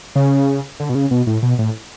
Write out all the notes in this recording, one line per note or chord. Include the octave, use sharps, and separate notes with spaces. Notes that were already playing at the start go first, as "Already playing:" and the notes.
C#3
D3
B2
C#3
B2
A2
B2
A2